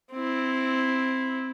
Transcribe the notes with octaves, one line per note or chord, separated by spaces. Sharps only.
C4 E4